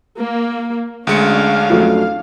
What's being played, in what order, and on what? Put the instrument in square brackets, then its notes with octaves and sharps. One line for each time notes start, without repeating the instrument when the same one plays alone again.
[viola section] A#3
[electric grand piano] D2 G#3 C#7 [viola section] C#4 D4 F5
[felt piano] F2 F#3 A3